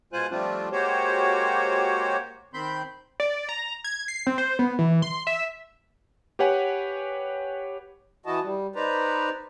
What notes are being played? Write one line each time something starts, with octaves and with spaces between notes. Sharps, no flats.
B2 G#3 F4 C5 G#5 F#6
F3 G3 A3 C4 D4 F4
G#3 A#3 F#4 G4 C5 C#5
D#3 C4 B5 C6 G6
D5
A#5
G#6
C7
C4
C5
B3
E3
C6
E5
G4 B4 C#5 F#5 G#5
E3 E4 F#4 D#5 A5
G3
D#4 B4 C5 D5 A#5